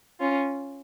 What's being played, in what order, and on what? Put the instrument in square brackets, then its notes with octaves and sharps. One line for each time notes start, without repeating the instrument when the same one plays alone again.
[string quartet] C#4 F4